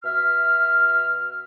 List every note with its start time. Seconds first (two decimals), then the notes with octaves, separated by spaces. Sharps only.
0.04 B2 E5 F6